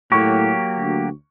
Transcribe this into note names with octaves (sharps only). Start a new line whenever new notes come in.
A2 F#3 A#3 G4 C#6
D2